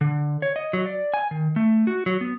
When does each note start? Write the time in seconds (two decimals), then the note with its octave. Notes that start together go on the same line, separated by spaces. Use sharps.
0.01 D3
0.42 C#5
0.56 D#5
0.73 F#3
0.86 D5
1.14 G#5
1.31 D#3
1.56 A3
1.87 F#4
2.06 F#3
2.21 B3